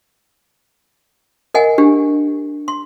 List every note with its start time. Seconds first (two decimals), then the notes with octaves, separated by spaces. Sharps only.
1.54 A#4 D#5 F#5 G#5
1.78 D4 G4
2.68 C6